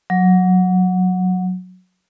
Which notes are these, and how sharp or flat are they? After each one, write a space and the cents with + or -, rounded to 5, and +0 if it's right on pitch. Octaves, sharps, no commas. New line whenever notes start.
F#3 -10